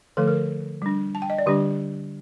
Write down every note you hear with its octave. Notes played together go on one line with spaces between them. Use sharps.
D3 F3 A3 A4
A#4
G3 D4
A5
G5
D#5
D5
D3 G3 D4 G4